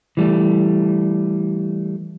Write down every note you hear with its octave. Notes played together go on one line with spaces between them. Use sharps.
E3 G3 A3